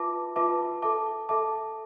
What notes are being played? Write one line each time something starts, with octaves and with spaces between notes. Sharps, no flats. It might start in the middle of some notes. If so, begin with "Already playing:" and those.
Already playing: F4 B4 E5 A5 D6
F4 B4 E5 A5 D6
A4 E5 A5 D6
A4 E5 A5 D6